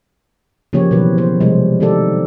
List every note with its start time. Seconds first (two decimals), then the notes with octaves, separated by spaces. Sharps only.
0.73 C#3 F3 A#3 G4 C#5
0.91 B2 E3 F#3 B4
1.18 C5
1.41 C3 F3 G3 G#3
1.80 D#3 C4 D#4 G4 A4 D5